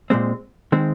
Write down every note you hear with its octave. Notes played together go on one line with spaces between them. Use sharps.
A#2 G#3 C4
D#3 G#3 C4